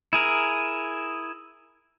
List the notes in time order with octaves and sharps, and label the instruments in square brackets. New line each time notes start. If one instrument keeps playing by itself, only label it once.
[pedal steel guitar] E4 G#4 A#4